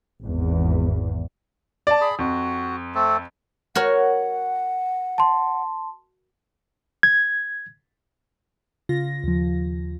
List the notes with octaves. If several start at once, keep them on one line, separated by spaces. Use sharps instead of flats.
G#1 E2
D5 A5
G#4 B5
F2 F#4
A3 C4 A4
F#4 A#4 C#5 F#5
A5 C6
G#6
C#3 F4 A#6
D#2 F3